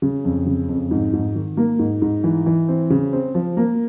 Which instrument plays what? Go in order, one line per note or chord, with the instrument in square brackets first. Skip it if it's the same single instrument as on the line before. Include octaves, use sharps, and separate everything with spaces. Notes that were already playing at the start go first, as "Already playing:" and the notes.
[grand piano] C#3
F2
C#3
F2
G#2
G#2
D#3
A#3
G#2
G#2
E3
E3
C4
C#3
C4
F3
A#3